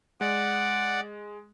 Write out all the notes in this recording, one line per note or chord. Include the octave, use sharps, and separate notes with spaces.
G#3 D5 F#5